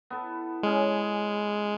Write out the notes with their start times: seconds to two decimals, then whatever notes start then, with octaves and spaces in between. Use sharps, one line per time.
0.10 B3 E4 A4
0.63 G#3 C#4 G#4